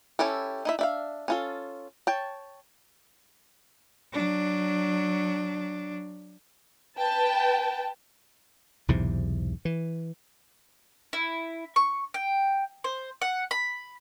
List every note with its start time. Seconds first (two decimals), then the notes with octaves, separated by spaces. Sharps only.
0.19 C#4 E4 G4 A4
0.65 D#4 E4 E5
0.79 D4 E5 F5
1.28 C#4 F4 A4
2.07 C#5 G5 A5
4.13 F#3 D4
6.98 B4 G5 A5
8.88 B1 E2 G#2 C3
9.65 E3
11.13 E4
11.76 C#6
12.14 G5
12.84 C5
13.22 F#5
13.51 B5